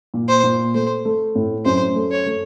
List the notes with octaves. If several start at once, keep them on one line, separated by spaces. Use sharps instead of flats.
A#2
C5
A#2
A3 C5
A3
A2
F#2 C5
A3
C#5
A3